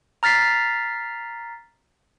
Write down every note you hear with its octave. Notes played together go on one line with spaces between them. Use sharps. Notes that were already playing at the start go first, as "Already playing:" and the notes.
A#5 F6 A6 B6 C7